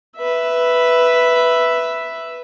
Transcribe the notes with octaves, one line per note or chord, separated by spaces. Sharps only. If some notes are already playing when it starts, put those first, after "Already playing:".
B4 E5